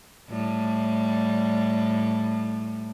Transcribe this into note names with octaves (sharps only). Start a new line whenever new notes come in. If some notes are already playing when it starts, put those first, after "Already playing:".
A2 G3